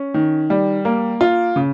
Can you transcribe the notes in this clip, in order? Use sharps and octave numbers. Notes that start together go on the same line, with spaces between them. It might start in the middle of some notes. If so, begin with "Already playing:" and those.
Already playing: C#4
D#3
G3
A#3
F4
C#3